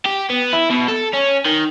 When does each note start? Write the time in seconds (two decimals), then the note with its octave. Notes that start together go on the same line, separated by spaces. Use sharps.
0.06 G4
0.30 B3
0.53 E4
0.70 B2
0.88 A4
1.14 C#4
1.46 D#3